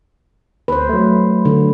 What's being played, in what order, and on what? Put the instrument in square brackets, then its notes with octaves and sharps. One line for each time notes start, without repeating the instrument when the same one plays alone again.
[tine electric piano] D2 [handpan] B4 C5
[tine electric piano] F#3 A3
[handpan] D3